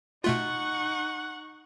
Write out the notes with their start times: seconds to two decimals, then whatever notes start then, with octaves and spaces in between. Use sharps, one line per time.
0.24 B2 A3 D#4 F4 F#5 C#6